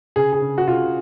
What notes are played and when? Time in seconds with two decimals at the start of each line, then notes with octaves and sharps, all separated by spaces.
0.16 C#3 G#4
0.33 G#4
0.41 C#3
0.58 F#4
0.68 C#3 F4